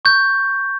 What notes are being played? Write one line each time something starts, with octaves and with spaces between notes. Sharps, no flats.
C#6 G6